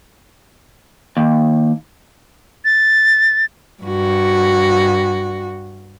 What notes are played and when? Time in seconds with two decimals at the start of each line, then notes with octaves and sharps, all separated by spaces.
1.17 D#2
2.65 A6
3.83 G2 F#4